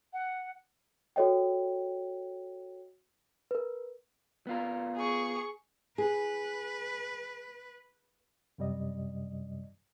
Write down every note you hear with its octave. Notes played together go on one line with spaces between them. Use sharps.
F#5
F#4 A4 C#5 D#5 G5
A#4 B4
B3 F4 A#4
G#4 C#6
G#4 B4
F#2 C3 G3 D5 D#5